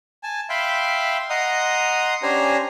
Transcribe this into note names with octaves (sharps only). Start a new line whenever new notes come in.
G#5 A5
E5 F5 G5 B5 C6
D#5 F#5 A#5 C6 D#6
C#4 D4 G4 C5 G#5 A#5